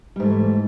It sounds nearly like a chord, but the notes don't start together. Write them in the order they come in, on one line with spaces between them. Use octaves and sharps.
G3 G#2 A3 E3